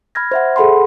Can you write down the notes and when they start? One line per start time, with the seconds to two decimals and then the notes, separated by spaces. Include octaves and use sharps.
0.15 B5 F6 G#6 A#6
0.31 C5 E5 F#5
0.56 G#4 A4 F#5 B5 C6